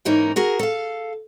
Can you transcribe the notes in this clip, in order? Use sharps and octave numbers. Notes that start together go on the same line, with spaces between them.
G#2 E3 A#3 C#4 D#4 A#4
F#4 G#4 A#4
A4 F5